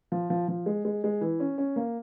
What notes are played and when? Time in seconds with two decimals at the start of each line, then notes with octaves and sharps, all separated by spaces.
0.12 F3
0.30 F3
0.48 F3
0.66 G#3
0.85 G#3
1.04 G#3
1.21 E3
1.40 C#4
1.58 C#4
1.76 A#3